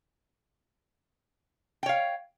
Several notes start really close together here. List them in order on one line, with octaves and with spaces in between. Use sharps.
G5 C#5 F5